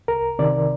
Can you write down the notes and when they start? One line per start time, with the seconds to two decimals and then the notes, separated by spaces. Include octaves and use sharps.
0.08 C2 A#4
0.39 C3 D#3 D5